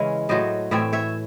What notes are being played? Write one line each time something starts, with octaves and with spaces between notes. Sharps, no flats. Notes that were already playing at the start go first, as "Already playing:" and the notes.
Already playing: C#3 E3 G#3 C#4
A2 F#3 A3 C5 D#5
A2 E3 C4 C#5 E5
C#5 E5